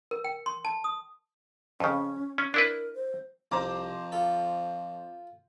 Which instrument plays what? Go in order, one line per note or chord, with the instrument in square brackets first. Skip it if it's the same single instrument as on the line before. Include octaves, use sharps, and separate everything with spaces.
[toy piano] A#4
G5
C6
A5
D#6
[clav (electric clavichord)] F2 C#3 [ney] C#4
[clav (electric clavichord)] C#4
[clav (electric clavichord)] D4 E4 B4 [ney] A#4
[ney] C5
[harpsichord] C2 [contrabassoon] F2 [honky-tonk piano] C5 A#5 D6
[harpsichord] F4 A4